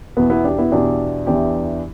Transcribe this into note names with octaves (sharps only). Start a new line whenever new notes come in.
E2 B2 B3
B3 E4
D4 G4
B3 E4
E2 B2 D4 G4
E2 E3 D4 G4